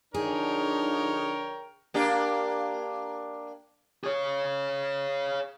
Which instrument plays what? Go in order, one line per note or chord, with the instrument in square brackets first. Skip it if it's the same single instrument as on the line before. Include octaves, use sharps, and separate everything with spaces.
[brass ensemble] D3 F3 D4 [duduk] D#4 [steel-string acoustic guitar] G#4 [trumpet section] A#4 C#5 G5
[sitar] A#3 D4 G4
[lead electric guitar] G#4 C#5